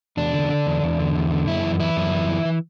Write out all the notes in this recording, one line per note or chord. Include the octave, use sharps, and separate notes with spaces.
E2 D4
D3
D3
E2
E2
D3
E2
D3
F#2 E4
E3
E3 E4
F#2
E3
E3
E3